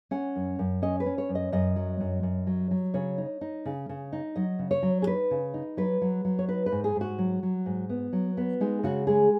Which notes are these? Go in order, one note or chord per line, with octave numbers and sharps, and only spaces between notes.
C#4 F#5
F#2
F#2
C#4 D#5
B4
C#4
C#5
F#2
D#5
F#2 D#5
F#3
F#2
F#2
F#3
F#3
C#3 C#5
D#4
D#4
C#3
C#3
D#4
F#3 D#5
C#3
C#5
F#3
G#4
D#4 B4
C#3
D#4
F#3 B4
F#3
F#3
C#5
D#4 B4
B4
G#2
G#4
G#2 F#4
F#3
F#3
G#2
B3
F#3
B3
G#3 D#4
C#3 F#4
G#3 G#4